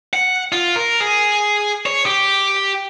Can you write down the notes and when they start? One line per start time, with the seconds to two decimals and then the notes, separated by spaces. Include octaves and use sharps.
0.13 F#5
0.52 F4
0.76 A#4
1.01 G#4
1.86 C#5
2.06 G4